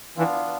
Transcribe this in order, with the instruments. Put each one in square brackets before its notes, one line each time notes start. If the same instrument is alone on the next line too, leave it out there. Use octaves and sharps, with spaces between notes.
[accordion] E3 [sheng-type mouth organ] B3 D4 F4